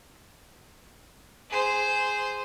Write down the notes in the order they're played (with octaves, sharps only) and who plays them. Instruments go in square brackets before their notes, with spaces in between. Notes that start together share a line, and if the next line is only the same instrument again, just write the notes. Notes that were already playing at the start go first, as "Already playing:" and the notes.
[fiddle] G#4 C5